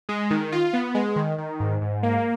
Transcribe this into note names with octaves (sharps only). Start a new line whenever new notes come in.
G#3
D#3
F4
B3
G#3
D#3
D#3
G#2
G#2
A#3